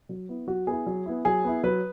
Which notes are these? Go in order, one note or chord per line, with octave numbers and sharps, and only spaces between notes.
F#3
B3 E4
F#3 F#4
B3 E4 G#4
F#3
B3 E4
F#3 G#4
B3 E4
F#3 B4